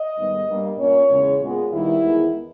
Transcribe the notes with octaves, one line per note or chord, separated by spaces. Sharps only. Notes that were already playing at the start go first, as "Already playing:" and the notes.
Already playing: D#5
G#2 D#3 G3 B3
G2 G3 A#3
A#2 A#3 C#4 C#5
E2 C#3 G#3 C#4
A#2 G#3 B3
D#2 D#3 G3 B3 E4
E2 D#3 G#3 B3